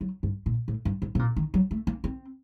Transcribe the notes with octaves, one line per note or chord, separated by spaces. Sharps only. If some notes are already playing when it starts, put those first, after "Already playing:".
F#3
G2
A#2
A2
G2
G2
C3
A#2
D#3
F#3
A3
A#3
C4